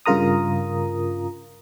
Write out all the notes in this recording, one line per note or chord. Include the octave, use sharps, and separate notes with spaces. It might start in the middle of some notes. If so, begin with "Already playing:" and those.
G2 C#3 F4 A#4 A#5 D#6